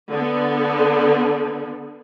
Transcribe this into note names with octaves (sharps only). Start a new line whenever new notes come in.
D3 B3